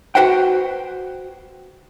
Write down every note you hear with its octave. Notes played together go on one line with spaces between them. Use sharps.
F#4 B4 C5 F#5 G5